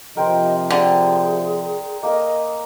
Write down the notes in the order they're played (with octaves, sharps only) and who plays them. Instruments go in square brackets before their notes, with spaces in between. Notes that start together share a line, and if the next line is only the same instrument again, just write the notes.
[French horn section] C3 F3 [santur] A#4 G5 C6 [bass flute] D#5
[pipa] D3 [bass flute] G#4 [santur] G5 G#5
[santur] A#3 A#4 [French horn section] D#5